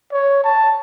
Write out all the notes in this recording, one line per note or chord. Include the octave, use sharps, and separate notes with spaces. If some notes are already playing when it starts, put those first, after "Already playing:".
C#5
A5